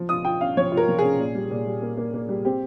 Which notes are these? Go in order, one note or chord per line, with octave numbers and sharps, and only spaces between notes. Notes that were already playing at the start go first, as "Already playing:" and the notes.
Already playing: F3
F4 D#6
F4 G5
C#4 F5
F3 C#5
F4
A#4
F3
G#4
C#4
A#2
G3
A#2
G3
A#3
A#3
A#3
G3
C4 G4